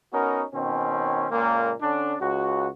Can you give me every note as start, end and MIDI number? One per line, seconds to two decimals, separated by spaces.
0.13 0.43 59
0.13 0.43 61
0.13 0.43 63
0.13 0.43 66
0.13 0.43 70
0.53 1.25 47
0.53 1.25 51
0.53 1.25 60
0.53 1.25 61
1.31 1.70 37
1.31 1.70 46
1.31 1.70 56
1.31 1.70 58
1.81 2.14 50
1.81 2.14 61
1.81 2.14 62
2.19 2.67 37
2.19 2.67 66